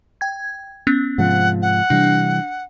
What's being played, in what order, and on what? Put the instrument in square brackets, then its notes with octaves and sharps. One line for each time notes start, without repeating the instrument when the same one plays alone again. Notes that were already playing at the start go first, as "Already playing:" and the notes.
[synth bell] G5 G#6
B3 C#4
[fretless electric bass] G#2 C3 F3 [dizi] F#5
[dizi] F#5
[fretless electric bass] C3 E3 G3 [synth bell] D4